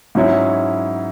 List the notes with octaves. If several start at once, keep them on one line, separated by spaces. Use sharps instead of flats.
G#2 F#3 C#4 E4